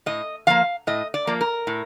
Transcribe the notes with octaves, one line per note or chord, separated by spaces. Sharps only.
A2 D#5
F3 A#3 F5
A2 D#5
D5
F3 A#3
A#4
A2